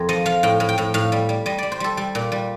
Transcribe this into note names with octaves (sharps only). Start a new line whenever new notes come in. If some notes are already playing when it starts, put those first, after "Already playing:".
Already playing: F2 A#4 C5
F3 D#5
F3 F5
A2 G5
A2
G5
A2
A2 F5
G3
G3
G3 D#5
G3 D5
C5
G3 A4
G3
A#2
G3